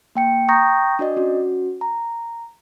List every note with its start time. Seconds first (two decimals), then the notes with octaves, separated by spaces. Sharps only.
0.15 A#3 G5 C#7
0.48 G5 A#5 C#6 D#6 G6 A#6
0.99 D4 F#4 D5 D#5
1.17 C#4 F#4
1.81 A#5